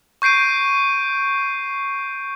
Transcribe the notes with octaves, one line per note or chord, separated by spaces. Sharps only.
C#6 G6 C7 D7 D#7